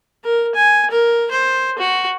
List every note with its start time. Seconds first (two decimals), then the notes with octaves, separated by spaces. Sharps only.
0.24 A#4
0.55 G#5
0.91 A#4
1.31 C5
1.79 F#4